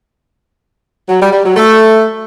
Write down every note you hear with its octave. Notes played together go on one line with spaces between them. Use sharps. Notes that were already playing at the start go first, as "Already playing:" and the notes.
F#3
G3
G3
F#3
A3